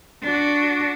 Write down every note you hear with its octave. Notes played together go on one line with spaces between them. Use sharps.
D4 F#4